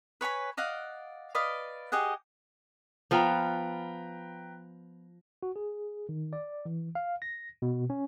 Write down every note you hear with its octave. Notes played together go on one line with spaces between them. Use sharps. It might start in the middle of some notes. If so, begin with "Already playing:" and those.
B4 C#5 G#5 B5
D5 D#5 F5 F#5
B4 D5 D#5 F5
G4 G#4 D#5 F#5
F3 B3 F4 B4 G5 A#5
F#4
G#4
D#3
D5
E3
F5
A#6
B2
C#4